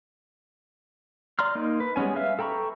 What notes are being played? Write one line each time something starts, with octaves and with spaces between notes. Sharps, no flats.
D5 A#5 C6 F6
A#3 D#4
B4
G3 G#3 B3 C#4 G#5
B4 E5 F5 F6
A4 G5 A#5 B5 C#6